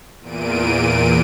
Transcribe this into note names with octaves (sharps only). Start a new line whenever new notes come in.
E2 A#2 D7 D#7